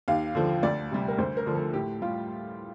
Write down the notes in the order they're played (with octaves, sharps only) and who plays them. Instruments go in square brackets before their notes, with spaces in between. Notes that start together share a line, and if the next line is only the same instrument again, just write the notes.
[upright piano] D#2 F5
D3 F3
D2 D5
C3 G3
A#4
D2 C5
A#4
D3 F3
A4
A2 G4
G3 F4